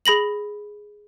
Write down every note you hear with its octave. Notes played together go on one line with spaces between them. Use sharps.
G#4 B5 A#6 F#7